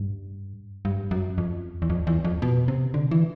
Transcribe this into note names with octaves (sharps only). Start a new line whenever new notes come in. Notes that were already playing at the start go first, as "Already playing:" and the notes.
Already playing: G2
G2
F#2
F2
E2
F2
E2
F2
B2
C3
D3
E3